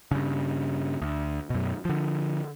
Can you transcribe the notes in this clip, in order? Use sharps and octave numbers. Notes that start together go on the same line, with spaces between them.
G2 C#3
D2
F#2 B2
D3 F3